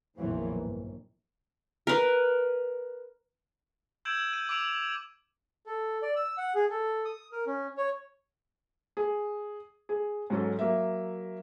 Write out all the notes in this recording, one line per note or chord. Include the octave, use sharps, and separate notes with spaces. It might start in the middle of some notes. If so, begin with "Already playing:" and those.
A#1 F2 B2 D#3 E3 F#3
G1
A#4 B4
E6 G6 G#6 D7 E7 F#7
G6 D#7
D6 E6 D7 F7 F#7
A4
D5
E6
F#5
G#4
A4
D#6
A#4
C#4
C#5
G#4
G#4
G#2 F#3 C#4 A4
F#3 A#3 E5